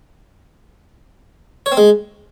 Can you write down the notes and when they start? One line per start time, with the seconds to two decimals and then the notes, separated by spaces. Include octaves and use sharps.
1.66 C#5
1.72 C4
1.77 G#3